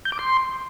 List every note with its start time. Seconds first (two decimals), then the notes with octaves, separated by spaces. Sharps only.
0.05 G6
0.12 D6
0.19 C6